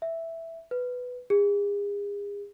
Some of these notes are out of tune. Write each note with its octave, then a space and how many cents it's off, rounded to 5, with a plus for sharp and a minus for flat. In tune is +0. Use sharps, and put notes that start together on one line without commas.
E5 +0
B4 +5
G#4 -40